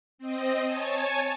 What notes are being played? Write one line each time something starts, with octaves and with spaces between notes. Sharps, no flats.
C4 D#5
C#5 G#5 A5